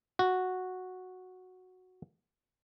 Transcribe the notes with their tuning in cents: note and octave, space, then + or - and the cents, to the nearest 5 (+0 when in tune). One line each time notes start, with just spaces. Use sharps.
F#4 -5